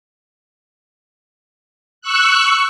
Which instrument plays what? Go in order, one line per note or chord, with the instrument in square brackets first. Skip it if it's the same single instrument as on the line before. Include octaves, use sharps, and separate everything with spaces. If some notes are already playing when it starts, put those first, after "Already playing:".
[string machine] C#6 E6 F#6